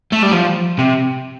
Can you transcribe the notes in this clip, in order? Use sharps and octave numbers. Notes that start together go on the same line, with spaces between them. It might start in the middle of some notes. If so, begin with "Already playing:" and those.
A3
G3
F3
C3